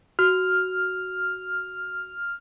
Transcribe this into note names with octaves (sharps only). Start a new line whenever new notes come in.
F#4 F6